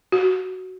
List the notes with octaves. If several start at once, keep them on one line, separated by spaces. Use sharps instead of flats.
F#4